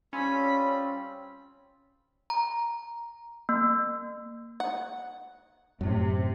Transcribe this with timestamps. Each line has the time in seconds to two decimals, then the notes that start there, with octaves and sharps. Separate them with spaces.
0.13 G3 C4 C#4 F4 B5
2.30 A#5
3.49 A#3
4.60 F#5
5.81 F#2 A2 C3